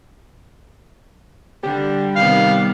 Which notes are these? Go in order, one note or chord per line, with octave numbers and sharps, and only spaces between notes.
D3 G3
C3 D#3 B3 F5